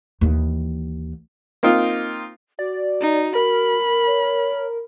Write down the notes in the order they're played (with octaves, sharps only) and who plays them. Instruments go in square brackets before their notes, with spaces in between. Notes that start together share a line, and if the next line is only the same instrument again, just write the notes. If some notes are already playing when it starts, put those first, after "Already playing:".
[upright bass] D#2 E3
[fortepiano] A#3 C4 D#4 F4
[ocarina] F#4 [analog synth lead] D5
[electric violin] D#4
[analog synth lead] A#4 [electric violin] B5
[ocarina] C#5